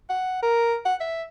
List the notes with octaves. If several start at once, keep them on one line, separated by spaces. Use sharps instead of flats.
F#5
A#4
F#5
E5